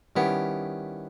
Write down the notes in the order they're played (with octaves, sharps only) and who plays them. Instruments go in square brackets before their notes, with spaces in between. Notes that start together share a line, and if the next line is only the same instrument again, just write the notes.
[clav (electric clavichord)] D#3 G3 C#4 E4 G4 [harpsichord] B3